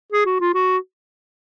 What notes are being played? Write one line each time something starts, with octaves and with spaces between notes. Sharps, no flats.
G#4
F#4
F4
F#4